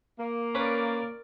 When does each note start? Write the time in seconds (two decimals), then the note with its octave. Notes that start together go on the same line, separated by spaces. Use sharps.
0.19 A#3
0.55 C#4 A#4 B4 D5 D6